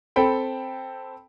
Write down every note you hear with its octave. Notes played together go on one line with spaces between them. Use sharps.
C4 A4 G5 B5